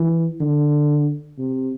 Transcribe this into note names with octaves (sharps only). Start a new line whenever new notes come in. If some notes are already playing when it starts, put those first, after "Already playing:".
Already playing: E3
D3
C3